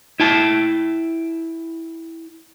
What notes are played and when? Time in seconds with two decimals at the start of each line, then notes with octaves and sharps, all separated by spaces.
0.20 E4 G5 A5